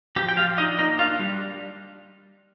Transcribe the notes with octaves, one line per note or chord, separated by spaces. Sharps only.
F3 G4 G5
G5
F3 F4 F5
D4 D#4 D#5
A#3 D#4 D#5
D4 F4 F5
G3